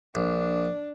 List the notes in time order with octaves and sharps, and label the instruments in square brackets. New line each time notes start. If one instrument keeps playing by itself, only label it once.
[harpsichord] A#1 [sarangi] D4